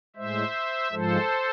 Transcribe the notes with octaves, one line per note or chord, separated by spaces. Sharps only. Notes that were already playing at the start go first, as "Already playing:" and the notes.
A2 G#3 C5 E5
G#2 F3 G#3 A4 C5